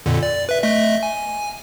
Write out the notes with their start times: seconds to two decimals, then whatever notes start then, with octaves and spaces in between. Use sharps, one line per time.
0.06 F2 A#2 D3
0.23 D5
0.49 B4 E5
0.63 A3 D#5 E5
1.03 G#5